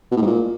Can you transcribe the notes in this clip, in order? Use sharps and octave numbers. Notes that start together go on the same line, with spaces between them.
B2
A2
G#2
A#2